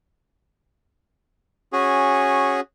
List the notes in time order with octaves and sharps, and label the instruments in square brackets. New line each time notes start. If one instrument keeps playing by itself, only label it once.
[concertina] C#4 F#4 G#4